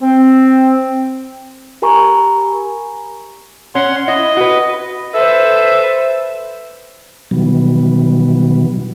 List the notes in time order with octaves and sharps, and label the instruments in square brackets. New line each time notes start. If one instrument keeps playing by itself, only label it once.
[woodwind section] C4
[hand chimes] G4 A#4 G#5 A#5 B5 C#6
[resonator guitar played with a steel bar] C#4 [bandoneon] F#5 C6
[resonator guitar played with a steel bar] E4 [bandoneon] D#5
[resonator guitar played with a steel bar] F#4 B4
[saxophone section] A4 E5 [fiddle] B4 C5
[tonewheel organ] B2 D#3 E3 F#3 G3 B3